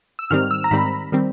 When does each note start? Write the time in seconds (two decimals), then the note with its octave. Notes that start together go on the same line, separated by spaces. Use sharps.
0.19 E6
0.30 G#2 D#3 G3 C4 F6
0.51 E6
0.64 A#5
0.71 G#2 D#3 G3 C4 B5
1.12 D#3 G3 C4